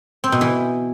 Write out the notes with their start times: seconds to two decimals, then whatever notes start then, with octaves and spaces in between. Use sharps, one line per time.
0.24 C4
0.32 B2
0.41 E3